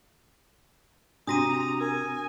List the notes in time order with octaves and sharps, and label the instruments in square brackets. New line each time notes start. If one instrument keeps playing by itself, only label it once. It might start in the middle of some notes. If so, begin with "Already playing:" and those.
[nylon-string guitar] C3 [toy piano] D4 F#4 D6 [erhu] A#5 [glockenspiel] D#6 A#6 D#7
[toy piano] A#4 [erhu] G#5